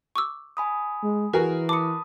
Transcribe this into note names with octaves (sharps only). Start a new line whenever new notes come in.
C#6 D6 E6
G#5 B5 D#6
G#3
E3 F#4 G#4 A#4 B4
A5 B5 D6 D#6 C#7